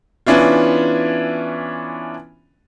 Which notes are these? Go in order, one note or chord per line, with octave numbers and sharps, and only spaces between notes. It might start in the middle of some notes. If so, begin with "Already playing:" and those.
E3 B3 C#4 D4 E4 F4